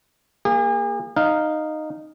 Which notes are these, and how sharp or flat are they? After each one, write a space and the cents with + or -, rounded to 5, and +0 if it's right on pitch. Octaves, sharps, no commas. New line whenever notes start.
A#3 +0 G#4 -40
D#4 -10 F5 +0